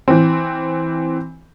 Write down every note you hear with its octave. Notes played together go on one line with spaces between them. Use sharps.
E3 C4